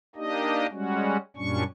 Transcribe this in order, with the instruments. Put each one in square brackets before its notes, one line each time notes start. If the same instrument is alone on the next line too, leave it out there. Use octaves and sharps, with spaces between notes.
[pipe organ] A#3 D4 D#4 G4 D#5
G3 G#3 C#4 F#4
F#2 A#2 G3 C#4 D4 C#6